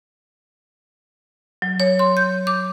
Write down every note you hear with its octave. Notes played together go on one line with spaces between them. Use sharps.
F#3
C#5
C6
G6
D6